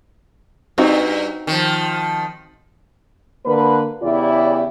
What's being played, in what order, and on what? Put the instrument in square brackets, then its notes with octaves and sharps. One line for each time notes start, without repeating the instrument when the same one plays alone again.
[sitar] G2 [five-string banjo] C4 D#4 F#4
[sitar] D#3 F3
[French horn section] D3 A#3 B4
E2 C#3 E4 G4 D5